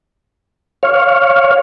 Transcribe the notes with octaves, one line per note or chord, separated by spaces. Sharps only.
C#5 F5